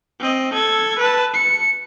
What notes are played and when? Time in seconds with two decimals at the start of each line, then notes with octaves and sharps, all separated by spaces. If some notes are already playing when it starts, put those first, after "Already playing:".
0.20 C4 D#5
0.54 A4 G#6
0.99 B4 A5
1.34 C#7